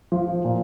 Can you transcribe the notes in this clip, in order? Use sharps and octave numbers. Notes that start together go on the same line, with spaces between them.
F3
A#2